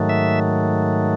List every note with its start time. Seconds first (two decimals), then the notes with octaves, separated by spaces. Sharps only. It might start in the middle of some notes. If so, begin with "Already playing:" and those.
Already playing: G#2 D#3 F#3 A3
0.09 E5